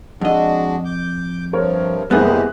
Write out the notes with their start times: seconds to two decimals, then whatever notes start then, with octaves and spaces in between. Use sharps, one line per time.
0.21 F2 G#3 D4 F#4 D#5
0.85 D6 G6
1.53 G2 C3 F3 A#4 C#5
2.11 F#1 C2 B3 G4 G#4 B4 D#5 F#6